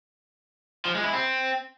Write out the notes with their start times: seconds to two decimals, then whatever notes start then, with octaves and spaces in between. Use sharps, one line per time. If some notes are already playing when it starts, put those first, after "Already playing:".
0.85 F3
0.95 G#3
1.04 E4
1.13 C4